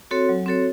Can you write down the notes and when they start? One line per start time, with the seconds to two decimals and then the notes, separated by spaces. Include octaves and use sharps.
0.11 C4 F#4 A4 C#5
0.29 F#3
0.46 C4 F#4 A4 C#5